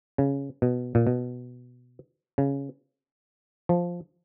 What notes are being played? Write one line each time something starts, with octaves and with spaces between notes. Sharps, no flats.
C#3
B2
A#2
B2
C#3
F3